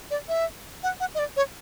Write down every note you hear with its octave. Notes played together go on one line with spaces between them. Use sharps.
D5
E5
F#5
F#5
D#5
D5
C#5